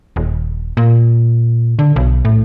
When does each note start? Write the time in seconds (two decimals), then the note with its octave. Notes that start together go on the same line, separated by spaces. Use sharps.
0.16 D#1
0.77 A#2
1.79 D3
1.96 B1
2.25 A2